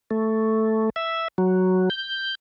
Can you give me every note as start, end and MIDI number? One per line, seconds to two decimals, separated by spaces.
0.11 0.90 57
0.96 1.28 76
1.38 1.89 54
1.90 2.35 91